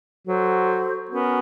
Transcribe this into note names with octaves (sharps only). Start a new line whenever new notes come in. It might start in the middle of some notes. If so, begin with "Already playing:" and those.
F#3 F#4 A4 C5
B3 C#4 F#4 A#4